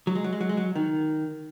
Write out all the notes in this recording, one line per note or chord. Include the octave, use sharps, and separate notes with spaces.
F#3
G#3
F#3
G#3
F#3
G#3
F#3
D#3